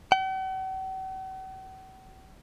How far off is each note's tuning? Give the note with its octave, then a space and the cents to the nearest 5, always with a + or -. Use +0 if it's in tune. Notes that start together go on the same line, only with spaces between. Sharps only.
F#5 +45